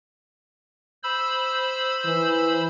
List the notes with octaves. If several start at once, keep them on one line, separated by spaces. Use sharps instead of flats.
C5 B5 E6
E3